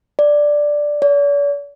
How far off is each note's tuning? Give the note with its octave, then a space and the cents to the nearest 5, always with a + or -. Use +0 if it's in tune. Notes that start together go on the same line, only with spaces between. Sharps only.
D5 +0
D5 -45